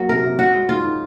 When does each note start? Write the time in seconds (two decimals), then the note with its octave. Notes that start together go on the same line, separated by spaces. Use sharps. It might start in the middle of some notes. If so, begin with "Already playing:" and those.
Already playing: F#3 A#3 F#4
0.09 C3 A#4
0.24 C3
0.39 C#4 F#4
0.55 G#3
0.69 D#3 F4
0.84 D#3